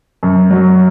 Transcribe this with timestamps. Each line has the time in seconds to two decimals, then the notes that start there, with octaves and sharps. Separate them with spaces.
0.23 F#2
0.51 F#3